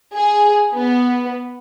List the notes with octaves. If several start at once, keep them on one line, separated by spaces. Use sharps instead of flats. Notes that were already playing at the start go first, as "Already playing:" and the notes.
G#4
B3